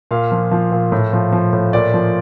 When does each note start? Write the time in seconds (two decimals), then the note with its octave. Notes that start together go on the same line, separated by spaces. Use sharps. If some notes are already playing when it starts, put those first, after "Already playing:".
0.11 A#2 F5
0.31 F3
0.51 F3
0.72 A#2
0.92 A2
1.13 F3
1.32 F3
1.53 A2
1.73 A#2 D5
1.94 F3